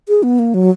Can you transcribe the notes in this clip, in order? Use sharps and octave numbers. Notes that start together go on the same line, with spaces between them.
G#4
B3
A#3
F#3